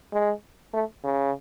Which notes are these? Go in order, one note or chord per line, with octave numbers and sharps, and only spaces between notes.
G#3
A3
C#3